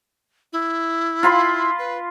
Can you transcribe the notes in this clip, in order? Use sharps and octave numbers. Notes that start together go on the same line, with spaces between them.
E4
F4 B5 C6
B4